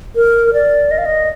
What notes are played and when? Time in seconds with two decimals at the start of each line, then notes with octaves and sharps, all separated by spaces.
0.16 A#4
0.54 D5
0.91 D#5
0.98 F5
1.05 D#5